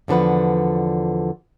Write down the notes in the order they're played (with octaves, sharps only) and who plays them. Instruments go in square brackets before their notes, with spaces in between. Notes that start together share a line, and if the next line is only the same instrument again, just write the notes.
[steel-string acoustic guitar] E2 D3 F3 B4 F#5